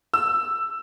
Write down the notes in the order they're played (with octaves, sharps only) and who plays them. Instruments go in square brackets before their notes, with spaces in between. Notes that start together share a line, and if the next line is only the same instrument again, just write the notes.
[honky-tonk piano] E6